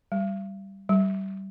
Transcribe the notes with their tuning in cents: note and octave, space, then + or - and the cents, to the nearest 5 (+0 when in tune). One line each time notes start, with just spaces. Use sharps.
G3 -5
G3 -25